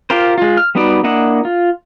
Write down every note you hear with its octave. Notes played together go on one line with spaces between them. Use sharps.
F4 G4 A#4 C5
G#3 F4
F6
G3 B3 D#4 F#4 D5
A#3 D4 E4 D#5 F#5
F4